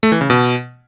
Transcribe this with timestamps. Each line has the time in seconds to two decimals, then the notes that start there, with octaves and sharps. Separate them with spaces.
0.03 A3
0.12 E3
0.21 C#3
0.30 B2